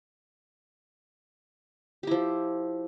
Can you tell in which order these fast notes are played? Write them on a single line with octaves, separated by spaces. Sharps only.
G4 E4 F3